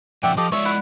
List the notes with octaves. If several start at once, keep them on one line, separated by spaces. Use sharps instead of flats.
A#2 C#3 F3 D5 E5 F#5 G5
F3 G4 A4 D#5 D6
G#3 F4 C#5 D5 E5 C#6
E4 F#5